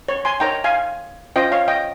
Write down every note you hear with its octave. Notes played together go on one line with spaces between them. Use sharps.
C#5
G#5 C6
D#4 A#4 C#5 G5 A#5
F5 G#5
C#4 F4 C5 D#5 G5
C#5 F5
D#5 G5